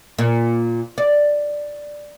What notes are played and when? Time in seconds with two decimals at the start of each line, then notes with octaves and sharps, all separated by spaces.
0.19 A#2
0.98 D5